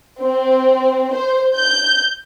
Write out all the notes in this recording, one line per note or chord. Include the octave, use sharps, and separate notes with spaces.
C4
C5
G6